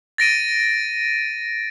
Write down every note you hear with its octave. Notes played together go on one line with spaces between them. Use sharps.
A6 A#6 D7 D#7